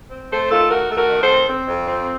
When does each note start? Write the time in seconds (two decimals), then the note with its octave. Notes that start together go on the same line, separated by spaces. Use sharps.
0.11 C4
0.31 A3 A4 C5
0.51 D#3 F4 A4
0.70 D#3 F#4 A#4
0.90 A3 A4
0.96 F#4 A#4
1.09 D#3
1.21 A4 C5
1.29 C4
1.48 C4
1.68 F2
1.87 C4